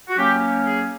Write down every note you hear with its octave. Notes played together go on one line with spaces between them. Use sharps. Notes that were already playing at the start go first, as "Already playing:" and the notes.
F#4
F#3 A#3 C#4 G4
G#4